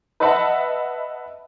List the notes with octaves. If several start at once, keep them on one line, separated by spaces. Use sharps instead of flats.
B4 D#5 E5 F#5 A5 B5